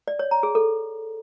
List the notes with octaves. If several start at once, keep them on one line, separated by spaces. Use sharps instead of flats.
D5
C#5
A#5
G#4
A4